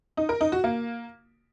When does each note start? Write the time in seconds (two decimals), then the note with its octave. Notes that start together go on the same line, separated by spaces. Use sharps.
0.17 D#4
0.29 A#4
0.41 D#4
0.52 F#4
0.64 A#3